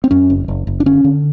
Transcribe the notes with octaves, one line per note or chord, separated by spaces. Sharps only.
C4
F#2 C#4
F#1
F#1
F#1
D4
D3 C#4
D3